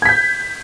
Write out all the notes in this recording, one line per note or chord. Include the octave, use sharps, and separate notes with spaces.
G6 G#6 B6